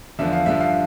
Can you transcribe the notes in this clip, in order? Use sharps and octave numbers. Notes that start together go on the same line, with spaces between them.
E2 D3 F3 E5
F5
G2 D3 F3 E5
F5